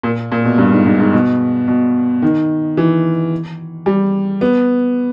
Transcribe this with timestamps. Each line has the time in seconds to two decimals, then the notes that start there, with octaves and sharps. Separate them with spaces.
0.03 A#2
0.32 A#2
0.45 B2
0.58 G2
0.72 G#2
0.86 G#2
1.00 G#2
1.13 B2
1.68 B2
2.22 D#3
2.77 E3
3.86 G3
4.41 B3